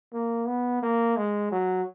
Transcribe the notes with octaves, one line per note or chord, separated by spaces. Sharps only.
A#3
B3
A#3
G#3
F#3